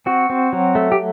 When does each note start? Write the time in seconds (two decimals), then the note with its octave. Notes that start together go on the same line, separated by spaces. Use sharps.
0.06 C4 F#4
0.30 C4
0.53 F#3
0.75 A3
0.92 G4